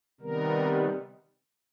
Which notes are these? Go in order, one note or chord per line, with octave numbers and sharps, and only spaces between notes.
C3 D#3 G3 B3 A#4